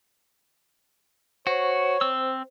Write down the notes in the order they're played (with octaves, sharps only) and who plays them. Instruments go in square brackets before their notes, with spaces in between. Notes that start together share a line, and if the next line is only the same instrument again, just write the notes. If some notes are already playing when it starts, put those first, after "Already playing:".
[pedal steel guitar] F#4 [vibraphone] C5 [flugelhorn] C#5
[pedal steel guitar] C4 E6